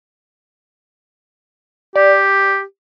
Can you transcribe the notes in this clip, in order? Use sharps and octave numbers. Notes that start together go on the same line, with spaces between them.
G4 D5